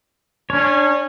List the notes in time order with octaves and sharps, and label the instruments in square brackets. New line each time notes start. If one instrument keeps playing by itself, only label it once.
[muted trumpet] C#4 [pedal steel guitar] D4 C#5